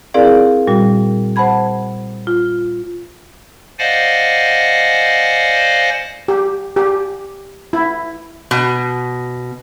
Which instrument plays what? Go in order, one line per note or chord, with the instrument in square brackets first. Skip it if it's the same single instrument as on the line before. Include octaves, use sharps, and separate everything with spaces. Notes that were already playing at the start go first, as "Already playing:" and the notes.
[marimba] C4 E4 G#4 A#4 D5 F5
A#2 G3 F#4
C5 F#5 A5 B5 G#6
F4
[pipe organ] C5 D5 D#5 F5 F#5 G#5
[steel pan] G4
G4
E4
[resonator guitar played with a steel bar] B2